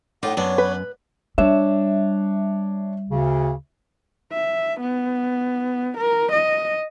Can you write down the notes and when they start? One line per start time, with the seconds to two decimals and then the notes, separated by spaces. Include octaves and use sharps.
0.23 A2 D#4 F4 F#5 D6
0.37 F#2 B3 D4 C#5
0.58 B4
1.38 G3 D4 C#5 E5
3.09 D2 C#3
4.32 E5
4.81 B3
5.98 A#4
6.32 D#5